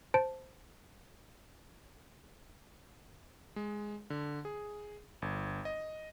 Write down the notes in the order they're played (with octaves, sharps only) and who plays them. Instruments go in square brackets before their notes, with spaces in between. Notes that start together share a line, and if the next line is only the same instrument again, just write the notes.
[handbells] C5 A5 D7
[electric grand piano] G#3
D3
G#4
G1
D#5